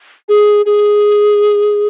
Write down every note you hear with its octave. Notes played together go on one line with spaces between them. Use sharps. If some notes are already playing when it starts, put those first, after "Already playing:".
G#4
G#4